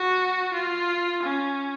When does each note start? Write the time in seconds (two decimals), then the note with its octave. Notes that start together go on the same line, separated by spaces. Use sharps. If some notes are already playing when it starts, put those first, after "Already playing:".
Already playing: F#4
0.54 F4
1.23 C#4